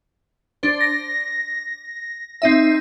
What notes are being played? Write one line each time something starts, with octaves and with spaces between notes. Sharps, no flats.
D4 C5
A#6
C4 D#4 E5